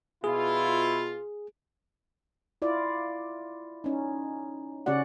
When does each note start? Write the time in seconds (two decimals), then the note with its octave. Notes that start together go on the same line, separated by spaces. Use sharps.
0.24 B2 E4 F4 G#4
2.62 E4 F4 D5
3.84 C#4 D#4
4.86 C#3 C#4 F#4 D5 F#5